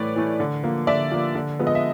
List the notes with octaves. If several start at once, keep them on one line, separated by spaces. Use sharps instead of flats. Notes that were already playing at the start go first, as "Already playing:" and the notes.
Already playing: A2 E3 A3 B4 C#5 D5
E3 A3
D3
F3 A#3
D3 D5 E5
F3 A#3
D3
F3 G#3 B3
D#5
E5